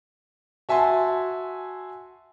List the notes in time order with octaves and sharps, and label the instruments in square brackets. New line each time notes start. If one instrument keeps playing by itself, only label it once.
[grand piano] F#4 E5 G#5 A5 C6